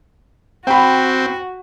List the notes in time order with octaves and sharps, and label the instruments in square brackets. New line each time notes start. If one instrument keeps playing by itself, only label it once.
[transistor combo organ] C4 [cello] F#4 [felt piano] G5 B5